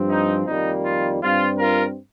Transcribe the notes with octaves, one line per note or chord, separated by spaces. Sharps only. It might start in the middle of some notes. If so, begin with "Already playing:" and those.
Already playing: G2 F3 C4
D#4
F2 D#3 G3 A#3 D#4
F4
G2 G3 C4 F4
F4 A#4